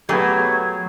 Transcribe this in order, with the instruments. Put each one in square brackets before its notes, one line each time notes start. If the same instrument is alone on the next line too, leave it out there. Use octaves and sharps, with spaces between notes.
[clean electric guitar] F#3 [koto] A3 G#4 [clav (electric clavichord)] B3 G4 [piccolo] G#6